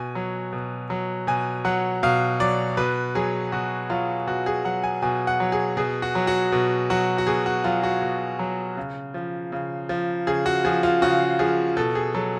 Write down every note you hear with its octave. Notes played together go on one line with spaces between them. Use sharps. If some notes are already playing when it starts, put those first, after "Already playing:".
Already playing: B2 G#5
F#3
B2
F#3
B2 G#5
F#3 F#5
B2 F5
F#3 D5
B2 B4
F#3 G#4
B2 F#4
F#3 F4
B2 F#4
G#4
F#3 F#5
G#5
B2 G#5
F#5
F#3
G#4
B2 G#4
F#4
F#3
F#4
B2
F#3 F#4
F#4
B2 G#4
F#4
F#3 F4
F#4
B2
F#3
C#3
F3
C#3
F3
C#3 G#4
F#4
F3 G#4
F4
C#3 F#4
F3 G#4
B2 A4
G#4
F#3 A4